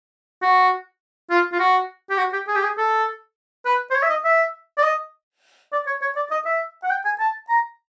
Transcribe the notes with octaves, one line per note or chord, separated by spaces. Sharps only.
F#4
F4
F4
F#4
G4
F#4
G4
G#4
G4
G#4
A4
B4
C5
C#5
E5
D#5
E5
D5
D#5
D5
C#5
C#5
D5
D#5
E5
F#5
G5
G#5
A5
A#5